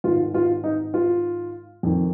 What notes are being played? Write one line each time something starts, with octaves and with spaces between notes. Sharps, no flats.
G#2 D#3 F4
F4
D#4
F4
F2 D#3